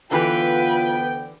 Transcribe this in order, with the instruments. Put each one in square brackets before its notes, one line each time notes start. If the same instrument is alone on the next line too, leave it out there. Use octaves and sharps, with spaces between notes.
[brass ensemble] D2 B3 G5 [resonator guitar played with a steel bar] D3 E3 G4 [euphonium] F4 [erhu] B4